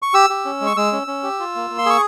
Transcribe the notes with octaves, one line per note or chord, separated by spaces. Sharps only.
C#6
G4 E6
G4
C#4
G#3
C#6
G#3 E6
C#4
C#4
G4
F4
A#3
A#3
C6
G#4 C#6